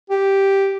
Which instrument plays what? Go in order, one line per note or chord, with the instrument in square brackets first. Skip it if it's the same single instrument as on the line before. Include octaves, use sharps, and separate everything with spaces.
[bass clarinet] G4